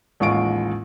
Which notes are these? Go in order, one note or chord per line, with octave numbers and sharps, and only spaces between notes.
A1 D#2 G#3 F4 C#6 D7